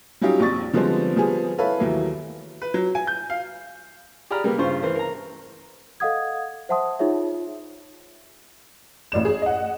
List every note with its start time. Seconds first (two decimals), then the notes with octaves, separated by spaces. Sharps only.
0.21 F#3 G3 C#4 D#4 F4 G4
0.40 A#1 F2 C#6 A6
0.73 D3 F3 G3 G#3 B3 C4
1.16 F3 G3 B3 G#4
1.58 E4 A4 B4 C#5 F5
1.80 D#2 E3 F#3 A3 A#3
2.62 B4
2.74 F#3
2.95 G#5
3.07 G6
3.30 F5
4.30 G4 G#4 D5 A#5 B5 F6
4.44 G3 A#3 B3
4.58 G2 C#3 F4 C5 C#6
4.83 E3 A#4 C5
4.95 A#4 A#5
6.00 A4 D#5 F5 F#5 D#6 G#6
6.69 C5 E5 F#5 A5 C6 D#6
6.99 D#4 F4 G#4 C#5 E5
9.12 A1 D5 E7
9.25 G#4
9.42 D#5 F#5